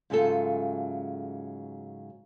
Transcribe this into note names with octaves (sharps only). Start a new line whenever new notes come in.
G#2 C#3 F#3 A3 F4 A4